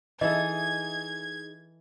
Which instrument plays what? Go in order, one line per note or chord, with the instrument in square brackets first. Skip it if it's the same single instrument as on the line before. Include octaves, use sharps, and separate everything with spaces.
[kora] E3 A4 [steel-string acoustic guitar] D#4 G#4 [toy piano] D#5 E5 [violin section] G#6